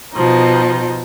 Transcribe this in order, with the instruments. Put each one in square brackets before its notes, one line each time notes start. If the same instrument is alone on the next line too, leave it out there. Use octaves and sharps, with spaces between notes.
[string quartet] B2 F3 D#4